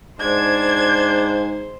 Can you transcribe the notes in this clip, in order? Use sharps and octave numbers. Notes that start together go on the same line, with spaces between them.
G#2 D4 C5 G#6